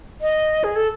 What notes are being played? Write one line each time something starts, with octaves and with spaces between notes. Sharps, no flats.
D#5
G#4
A4